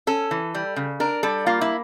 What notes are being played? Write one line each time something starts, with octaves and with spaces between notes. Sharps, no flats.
C#4 A4
E3
G3
C#3
D4 A#4
G3 A4
A#3 F4
E4